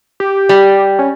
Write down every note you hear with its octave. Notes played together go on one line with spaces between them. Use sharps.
G4
G3
C#4